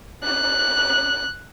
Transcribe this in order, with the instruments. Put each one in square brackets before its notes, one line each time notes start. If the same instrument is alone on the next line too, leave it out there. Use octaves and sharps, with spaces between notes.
[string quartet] F#6